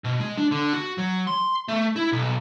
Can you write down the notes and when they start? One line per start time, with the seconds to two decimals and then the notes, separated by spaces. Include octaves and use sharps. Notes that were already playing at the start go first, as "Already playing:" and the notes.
0.04 B2
0.20 G#3
0.38 D4
0.51 D3
0.74 F#4
0.98 F#3
1.27 C6
1.68 A3
1.96 E4
2.12 B1